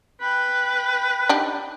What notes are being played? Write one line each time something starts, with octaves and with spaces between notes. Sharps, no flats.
B4 G5 B5
D4 D#4 G4